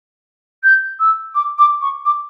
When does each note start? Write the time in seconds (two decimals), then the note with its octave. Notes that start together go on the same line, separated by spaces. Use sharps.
0.63 G6
0.99 E6
1.34 D6
1.58 D6
1.81 C#6
2.05 D6